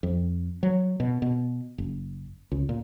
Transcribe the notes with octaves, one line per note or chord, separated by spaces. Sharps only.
F2
F#3
B2
B2
F#1
C#2
A#2